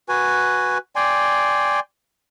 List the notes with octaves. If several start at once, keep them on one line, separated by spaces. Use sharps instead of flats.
F#4 B4 G#5
D5 G5 G#5 C6